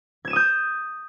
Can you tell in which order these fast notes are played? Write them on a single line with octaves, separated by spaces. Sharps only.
G#6 E7 D#7 D#6 G6